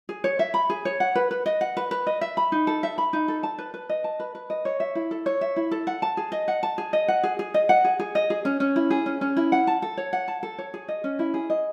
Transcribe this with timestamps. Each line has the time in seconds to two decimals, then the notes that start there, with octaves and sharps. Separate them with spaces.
0.09 G#4
0.24 C#5
0.39 E5
0.54 B5
0.70 G#4
0.85 C#5
1.00 F#5
1.15 B4
1.31 B4
1.46 D#5
1.61 F#5
1.77 B4
1.91 B4
2.07 D#5
2.21 E5
2.37 B5
2.52 D#4
2.67 A4
2.83 E5
2.98 B5
3.13 D#4
3.28 A4
3.43 A5
3.58 B4
3.74 B4
3.89 D#5
4.04 A5
4.20 B4
4.35 B4
4.50 D#5
4.65 C#5
4.80 E5
4.95 E4
5.11 A4
5.26 C#5
5.41 E5
5.56 E4
5.71 A4
5.87 F#5
6.02 A5
6.17 G#4
6.32 D#5
6.48 F#5
6.63 A5
6.78 G#4
6.93 D#5
7.08 F#5
7.23 G#4
7.39 G#4
7.54 D#5
7.69 F#5
7.84 G#4
7.99 G#4
8.15 D#5
8.30 G#4
8.45 C#4
8.60 C#4
8.76 E4
8.90 G#4
9.06 C#4
9.21 C#4
9.37 E4
9.52 F#5
9.67 A5
9.82 A4
9.97 C#5
10.13 F#5
10.28 A5
10.43 A4
10.58 C#5
10.74 G#4
10.88 D#5
11.04 C#4
11.19 E4
11.34 G#4
11.50 D#5